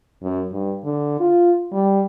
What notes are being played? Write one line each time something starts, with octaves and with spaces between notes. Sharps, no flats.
F#2
G2
D3
F4
G3